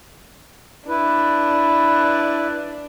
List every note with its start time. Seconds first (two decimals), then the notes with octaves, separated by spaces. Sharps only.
0.88 D4 E4 B4